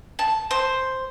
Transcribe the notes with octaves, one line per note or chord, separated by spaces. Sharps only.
A5
C5